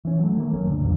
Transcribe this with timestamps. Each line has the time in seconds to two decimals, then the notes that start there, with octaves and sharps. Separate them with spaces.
0.05 E3 C#4
0.20 F#3 A3
0.37 D#3 A3 A#3
0.53 F#1 F#2 F#3 C#4
0.69 D1 D3
0.81 E1 A1 F2